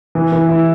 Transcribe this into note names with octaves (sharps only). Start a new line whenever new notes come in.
E3
E3
E4